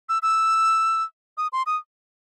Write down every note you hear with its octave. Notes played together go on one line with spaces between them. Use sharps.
E6
E6
D#6
C6
D#6